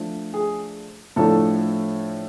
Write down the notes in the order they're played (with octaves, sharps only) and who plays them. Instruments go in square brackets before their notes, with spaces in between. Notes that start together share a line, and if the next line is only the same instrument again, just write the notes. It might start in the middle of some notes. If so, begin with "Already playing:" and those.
Already playing: [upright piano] F3 A3 D4
G#4
A2 F3 A3 D4 A4